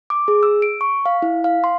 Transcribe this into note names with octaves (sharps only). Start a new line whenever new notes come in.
D6
G#4
E6
D7
C#6
F5
E4
F5
C6